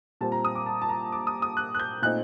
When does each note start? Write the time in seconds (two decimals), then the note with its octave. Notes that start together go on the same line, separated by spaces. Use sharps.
0.21 A#2 G3 C4 A5
0.32 A#5
0.45 D#6
0.55 D6
0.66 A5
0.82 A5
0.89 A#5
1.12 D6
1.27 D#6
1.42 D#6
1.57 F#6
1.75 F#6
1.80 G6
2.02 A#2 A3 C4 D#4 F#6